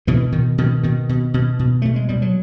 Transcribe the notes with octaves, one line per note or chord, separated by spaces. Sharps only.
B2 D3 E3
B2 D#3
B2 D#3
B2 D#3
B2
B2
B2
B2 A3
G#3
B2 G3
F#3